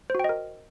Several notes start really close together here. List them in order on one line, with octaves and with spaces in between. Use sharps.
C5 F#4 G5 D#5 A#4